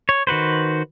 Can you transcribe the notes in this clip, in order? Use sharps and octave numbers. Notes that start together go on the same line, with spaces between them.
C#5
D#3 F#4 B4 C5